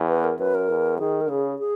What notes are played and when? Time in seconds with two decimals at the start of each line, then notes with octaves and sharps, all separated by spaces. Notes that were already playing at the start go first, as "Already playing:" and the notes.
Already playing: E2
0.09 B4
0.24 A#4
0.39 F#2 B4
0.55 A#4
0.69 E2
0.99 D#3 G#4
1.21 A#4
1.29 C#3 G#4
1.59 G#4